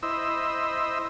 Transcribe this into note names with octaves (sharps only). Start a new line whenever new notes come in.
E4 C5 D#5 E6